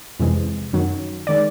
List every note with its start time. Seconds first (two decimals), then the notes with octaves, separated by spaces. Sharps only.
0.20 F2 C3 E3 G#3
0.73 F#2 D#3 F#3
1.27 D#3 G#3 D5